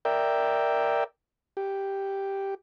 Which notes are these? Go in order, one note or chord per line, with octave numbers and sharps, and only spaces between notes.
A#4 D5 E5 G5
G4